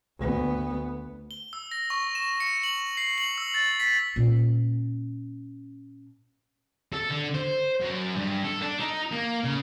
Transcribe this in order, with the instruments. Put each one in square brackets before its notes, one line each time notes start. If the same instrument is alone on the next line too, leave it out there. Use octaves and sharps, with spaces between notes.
[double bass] D2 B3
[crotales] G7
E6
A#6
C#6
E7
C#7
F#7
C7
F#7
E6
A6
B6
[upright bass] A#2 C#4
[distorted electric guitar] A4
D3
C5
F#2
G2
A4
D4
D#4
A#3
C#3